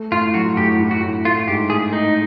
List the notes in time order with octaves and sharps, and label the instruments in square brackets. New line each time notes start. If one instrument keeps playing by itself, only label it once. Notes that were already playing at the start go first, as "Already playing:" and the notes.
Already playing: [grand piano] A3
[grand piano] A2 [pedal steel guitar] F4
[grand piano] F#3 [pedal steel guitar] F#4
[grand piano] A2 [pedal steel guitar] G4
[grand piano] A2
[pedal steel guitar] F#4
[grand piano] A2
[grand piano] A3 [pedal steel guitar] F4
[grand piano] G#2 [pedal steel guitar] G4
[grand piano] A3 [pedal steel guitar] G#4
[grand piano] A3 [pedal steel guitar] D#4